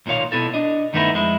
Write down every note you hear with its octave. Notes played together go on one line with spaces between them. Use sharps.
B1 A#2 D#3 C#5 F5
B2 B3 E4 A4
D4 D#5
G2 D#3 A3 B3 D#4 E4
F2 G#3 E4